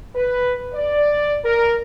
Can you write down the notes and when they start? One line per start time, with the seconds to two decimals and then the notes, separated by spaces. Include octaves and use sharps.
0.15 B4
0.73 D5
1.44 A#4